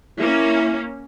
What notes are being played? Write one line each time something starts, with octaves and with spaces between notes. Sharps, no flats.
A#3 C#4 E4